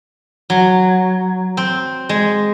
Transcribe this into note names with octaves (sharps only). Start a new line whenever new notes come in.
F#3
C4
G#3